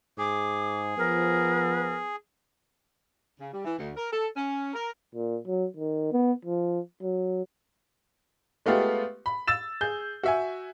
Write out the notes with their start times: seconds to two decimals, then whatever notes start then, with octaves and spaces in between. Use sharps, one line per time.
0.18 G#2 G#4 D6
0.98 F3 B3 A#4
3.39 C#3
3.53 G3
3.65 E3
3.79 D2
3.96 A#4
4.12 A4
4.36 C#4
4.74 A#4
5.15 A#2
5.47 F#3
5.77 D#3
6.12 B3
6.45 F3
7.02 F#3
8.66 G#3 A3 B3 F4 G4
9.26 B5
9.48 E6 A6 E7
9.81 G#4 G6
10.23 F#4 E5 G#5